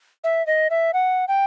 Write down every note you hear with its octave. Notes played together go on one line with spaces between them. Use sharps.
E5
D#5
E5
F#5
G5